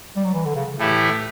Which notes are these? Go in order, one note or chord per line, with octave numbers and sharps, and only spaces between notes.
G3
F#3
E3
D3
C#3
A2 E3 A3 E4 G4